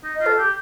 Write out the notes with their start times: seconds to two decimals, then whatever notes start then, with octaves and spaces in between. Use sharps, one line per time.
0.04 D#4
0.15 D#5
0.21 F4
0.26 A4
0.38 G4